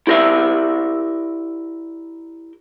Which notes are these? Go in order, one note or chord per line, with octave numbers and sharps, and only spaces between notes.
E4 G4 A#4 D5 E5